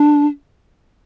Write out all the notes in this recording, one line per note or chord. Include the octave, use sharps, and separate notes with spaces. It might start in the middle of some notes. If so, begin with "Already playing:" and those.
Already playing: D4